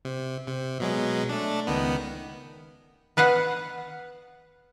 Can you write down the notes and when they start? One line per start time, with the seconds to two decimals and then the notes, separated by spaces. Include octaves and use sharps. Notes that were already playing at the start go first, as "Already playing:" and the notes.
0.05 C3
0.47 C3
0.80 B2 F#3 G#3
1.29 A3 D4
1.67 C#2 D#3 B3
3.17 B3 B4 F5 F#5